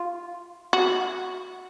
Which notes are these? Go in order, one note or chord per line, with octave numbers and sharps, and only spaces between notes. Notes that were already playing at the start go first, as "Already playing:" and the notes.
Already playing: F4
F#4